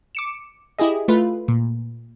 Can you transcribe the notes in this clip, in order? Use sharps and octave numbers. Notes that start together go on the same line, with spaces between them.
D6 C#7 E7
E4 G4 G#4 D#5
A3 F4 B4
A#2